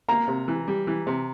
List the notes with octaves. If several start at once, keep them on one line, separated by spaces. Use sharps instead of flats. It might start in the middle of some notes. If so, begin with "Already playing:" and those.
A#3 A#5
C3
E3
G3
E3
C3